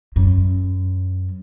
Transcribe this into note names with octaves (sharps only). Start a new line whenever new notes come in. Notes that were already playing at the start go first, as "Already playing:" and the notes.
F#2